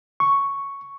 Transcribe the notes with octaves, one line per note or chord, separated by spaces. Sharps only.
C#6